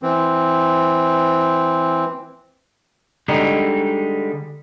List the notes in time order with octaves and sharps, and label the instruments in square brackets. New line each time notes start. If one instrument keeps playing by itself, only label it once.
[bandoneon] E3 C4
[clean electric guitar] D3 G3 G#3 D#4